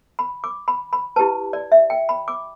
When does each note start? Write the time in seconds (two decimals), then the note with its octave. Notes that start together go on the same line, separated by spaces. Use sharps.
0.19 B5
0.44 D6
0.68 B5
0.93 B5
1.16 E4 G4 B4 A5
1.53 D5
1.72 E5
1.90 G5
2.09 B5
2.28 D6